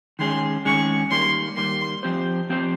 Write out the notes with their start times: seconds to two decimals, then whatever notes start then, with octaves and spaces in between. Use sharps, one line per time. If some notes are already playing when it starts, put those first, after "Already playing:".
0.19 D#3 G#3 C#4 G#4 C6
0.65 D#3 G#3 C#4 G#4 C#6
1.11 D#3 G3 A#3 C6
1.57 D#3 G3 A#3 C6
2.03 F3 C4 G4 C5
2.49 F3 C4 G4 C5